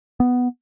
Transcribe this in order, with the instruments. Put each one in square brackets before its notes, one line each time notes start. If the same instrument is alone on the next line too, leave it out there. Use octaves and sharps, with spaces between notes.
[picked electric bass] B3